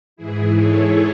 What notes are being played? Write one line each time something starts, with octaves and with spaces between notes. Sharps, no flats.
G#2 E3 E4 G#4
A4 C#5